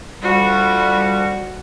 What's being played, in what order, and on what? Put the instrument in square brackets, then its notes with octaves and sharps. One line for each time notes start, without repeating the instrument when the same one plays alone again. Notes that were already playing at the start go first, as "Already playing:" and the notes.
[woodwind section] D2 F3 G3 [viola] F#4